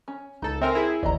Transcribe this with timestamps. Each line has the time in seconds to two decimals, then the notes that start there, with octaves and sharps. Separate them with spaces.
0.08 C#4
0.42 C#2 D#4 A4
0.61 C4 A#4 E5 G#5
0.75 E4 G#4
1.03 A1 D#2 D5 D#5 A#5